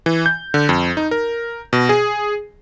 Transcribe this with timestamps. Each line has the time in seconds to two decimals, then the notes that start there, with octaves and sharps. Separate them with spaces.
0.06 E3
0.26 G6
0.54 D3
0.69 F2
0.97 D#4
1.11 A#4
1.73 B2
1.89 G#4